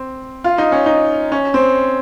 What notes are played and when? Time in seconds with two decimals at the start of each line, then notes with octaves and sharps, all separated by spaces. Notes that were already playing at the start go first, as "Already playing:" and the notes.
Already playing: C4
0.44 F4
0.58 D#4
0.72 C#4
0.86 D#4
1.32 C#4
1.54 C4